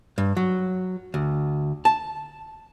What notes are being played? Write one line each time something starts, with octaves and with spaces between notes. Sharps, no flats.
G2
F#3
D2
A5